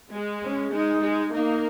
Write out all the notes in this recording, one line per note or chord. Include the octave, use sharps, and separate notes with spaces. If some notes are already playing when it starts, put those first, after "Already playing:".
G#3
C#4
G#3 D#4
G#3
A#3 D#4